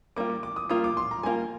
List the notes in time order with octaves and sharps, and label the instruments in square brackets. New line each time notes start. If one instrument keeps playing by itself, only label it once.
[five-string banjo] G3 A#3 F4 [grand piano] D6
[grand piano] D6
D6
D#6
[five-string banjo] G3 A#3 F4 [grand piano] D#6
[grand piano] D6
C6
A#5
[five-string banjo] G3 A#3 F4 [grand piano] G#5